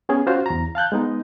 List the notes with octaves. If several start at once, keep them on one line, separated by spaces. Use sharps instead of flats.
B3 C#4 G#4
C#4 F4 F#4 C5 C#5
E2 A#5
F5 A5 F#6 G6
G#3 B3 D#4